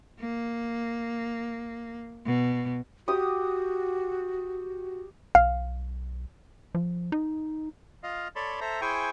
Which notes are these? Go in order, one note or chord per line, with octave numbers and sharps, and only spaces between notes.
A#3
B2
F#4 G4 D#6
B1 F5
F3
D#4
F4 D#5 F5
A4 C#5 D5 A5 B5 C6
A4 C5 E5 A#5
E4 G#4 C5 G5 G#5 C#6